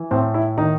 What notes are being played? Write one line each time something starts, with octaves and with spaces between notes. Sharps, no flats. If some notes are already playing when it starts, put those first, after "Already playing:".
Already playing: E3
A2 C4
E4
D#3 D#4